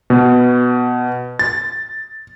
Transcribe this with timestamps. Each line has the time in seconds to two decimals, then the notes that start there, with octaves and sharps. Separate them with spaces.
0.10 B2
1.39 A6